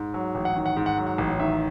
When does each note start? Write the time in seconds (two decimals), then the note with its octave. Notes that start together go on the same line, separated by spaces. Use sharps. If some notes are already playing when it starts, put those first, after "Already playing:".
Already playing: G#2
0.14 F#3
0.35 A1
0.45 F#5
0.56 D#3
0.66 F#5
0.76 G#2
0.86 F#5
0.98 F#3
1.07 F#5
1.18 A1
1.40 D#3 E5